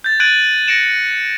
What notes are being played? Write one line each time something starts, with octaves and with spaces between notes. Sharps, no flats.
G6 A6
F#6 G#6 A6 D7 D#7 F#7
A#6 C#7 D7 E7